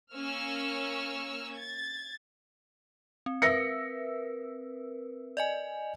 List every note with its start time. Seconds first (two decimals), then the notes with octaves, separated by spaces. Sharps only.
0.13 A#3 C#4 C#6 E6 F6
1.53 G#6 A6
3.26 C4
3.42 C4 A#4 B4 E5 A#6 C#7
5.37 D5 D#5 G#5